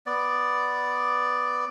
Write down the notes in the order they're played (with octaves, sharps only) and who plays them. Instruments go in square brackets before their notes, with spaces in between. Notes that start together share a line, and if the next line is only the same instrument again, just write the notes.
[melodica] B3 D5